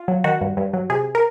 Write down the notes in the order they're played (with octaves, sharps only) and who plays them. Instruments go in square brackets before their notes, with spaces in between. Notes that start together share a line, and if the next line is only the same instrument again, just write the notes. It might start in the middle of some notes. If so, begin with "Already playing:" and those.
Already playing: [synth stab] F4
F#3
D#3 F#4
G2
G2
F#3
C3 G#4
A#4